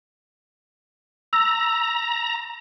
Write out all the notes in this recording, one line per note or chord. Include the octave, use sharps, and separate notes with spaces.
A#5 E6 A#6